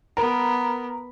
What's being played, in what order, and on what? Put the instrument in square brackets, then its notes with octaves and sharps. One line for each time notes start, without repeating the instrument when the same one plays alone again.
[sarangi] B3 [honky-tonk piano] A#4